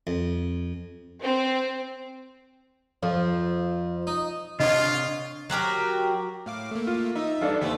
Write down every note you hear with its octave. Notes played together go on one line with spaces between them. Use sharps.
F2
C4
F2 F3
D#4
C3 D4 F4 C#5 D#5
F#3 F#4 G4 A#4
A2 F5 D6
A3 A#3
F4
D#4 E5
G2 D4 A4 F5
D#2 A3 B4 C5 E5